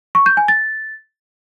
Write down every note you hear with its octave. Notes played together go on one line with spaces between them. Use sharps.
C#6
G6
G#5
A6